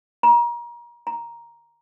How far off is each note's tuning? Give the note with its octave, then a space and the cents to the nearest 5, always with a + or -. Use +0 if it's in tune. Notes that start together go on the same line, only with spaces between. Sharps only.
A#5 +30
A#5 +5